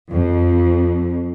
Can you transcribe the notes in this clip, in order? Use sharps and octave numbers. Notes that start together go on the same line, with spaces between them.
F2